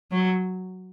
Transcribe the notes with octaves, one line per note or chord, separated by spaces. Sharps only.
F#3